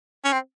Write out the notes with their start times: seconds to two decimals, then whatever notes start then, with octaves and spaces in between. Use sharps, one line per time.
0.24 C#4
0.32 C4